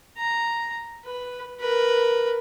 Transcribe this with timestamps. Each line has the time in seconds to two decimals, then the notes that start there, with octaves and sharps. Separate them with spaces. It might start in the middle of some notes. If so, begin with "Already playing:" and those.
0.18 A#5
1.05 B4
1.60 A#4 B4